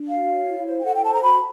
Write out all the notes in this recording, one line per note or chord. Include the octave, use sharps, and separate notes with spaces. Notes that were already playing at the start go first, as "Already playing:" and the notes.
Already playing: D4
F#4 F5
C#5
E4
C5
G5
A4 F#5
G5
C5 A5
A#5
F#4 B5